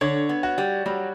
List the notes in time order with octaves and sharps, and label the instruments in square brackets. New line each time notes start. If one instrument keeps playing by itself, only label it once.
[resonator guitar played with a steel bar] D3 [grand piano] C#5
[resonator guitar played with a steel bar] B3
[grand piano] F#4
[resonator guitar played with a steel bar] G3
[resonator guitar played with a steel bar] F#3 [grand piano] G3